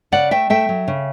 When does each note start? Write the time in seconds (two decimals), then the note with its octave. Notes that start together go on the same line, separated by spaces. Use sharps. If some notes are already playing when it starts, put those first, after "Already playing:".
0.12 C#3 D5 F#5
0.31 A3 E5 G5
0.50 A3 E5 G5
0.69 F#3
0.88 C#3